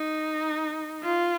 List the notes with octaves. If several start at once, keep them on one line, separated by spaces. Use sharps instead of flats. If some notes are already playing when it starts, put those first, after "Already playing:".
Already playing: D#4
F4